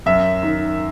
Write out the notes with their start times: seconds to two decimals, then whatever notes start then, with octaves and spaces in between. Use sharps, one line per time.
0.06 F#2 E5
0.43 D#3